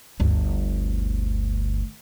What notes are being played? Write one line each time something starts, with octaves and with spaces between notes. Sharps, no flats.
G1 D2